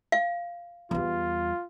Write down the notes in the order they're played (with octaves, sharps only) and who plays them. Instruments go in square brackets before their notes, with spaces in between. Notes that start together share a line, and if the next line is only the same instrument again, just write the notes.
[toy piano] F5
[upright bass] E2 G3 [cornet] F4